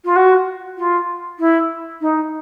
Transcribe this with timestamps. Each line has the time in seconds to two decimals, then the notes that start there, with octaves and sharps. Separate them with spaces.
0.05 F4
0.16 F#4
0.78 F4
1.39 E4
2.01 D#4